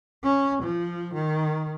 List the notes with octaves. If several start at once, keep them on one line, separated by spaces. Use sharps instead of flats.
C#4
F3
D#3